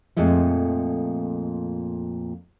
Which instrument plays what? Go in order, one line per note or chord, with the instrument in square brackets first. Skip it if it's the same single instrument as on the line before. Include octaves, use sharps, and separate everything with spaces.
[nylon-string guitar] F2 A#2 G#3 A3